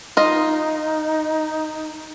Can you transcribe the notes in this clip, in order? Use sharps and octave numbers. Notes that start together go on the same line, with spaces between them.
D#4 F4 D#5